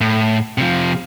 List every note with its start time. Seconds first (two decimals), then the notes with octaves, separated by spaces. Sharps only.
0.01 A2
0.58 C3 F3